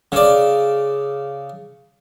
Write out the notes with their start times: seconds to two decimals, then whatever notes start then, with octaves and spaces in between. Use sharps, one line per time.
0.12 C#3 D5